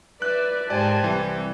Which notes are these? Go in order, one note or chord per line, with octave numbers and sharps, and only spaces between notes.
B4 D5 E5 F#6
G#2 G4 A#4 C5 D5 G#5 A5
C2 E3 G3